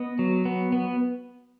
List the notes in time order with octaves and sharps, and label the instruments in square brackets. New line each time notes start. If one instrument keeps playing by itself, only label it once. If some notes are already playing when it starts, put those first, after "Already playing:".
Already playing: [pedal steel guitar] B3 D#5
F#3
B3
B3